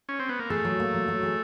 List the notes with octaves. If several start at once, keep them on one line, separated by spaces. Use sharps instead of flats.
C#4
C4
B3
A#3
A3 G#4
F#3
A#3
F#3
F#3
G#4